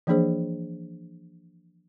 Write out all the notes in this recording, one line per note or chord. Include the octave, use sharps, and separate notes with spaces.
E3 F3 A#3 D4 G#4 C5